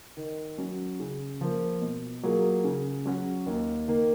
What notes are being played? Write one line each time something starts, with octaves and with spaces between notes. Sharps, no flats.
D#3
F#3 C#4
C#3
F3 A#3
B2
F#3 A#3 F4 G#4
C#3
F#3 C#4 F#4
D#2
D#3 A#3